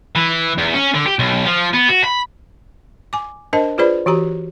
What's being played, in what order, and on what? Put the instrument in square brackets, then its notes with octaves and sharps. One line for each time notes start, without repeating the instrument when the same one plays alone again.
[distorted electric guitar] E3
E2
C#4
D3
G4
B1
F3
B3
F#4
B5
[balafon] G#5 D6
D4 A#4 C5 D#5 A5
F4 G#4 B4 C5 D5 B5
E3 F#4 G4 A#5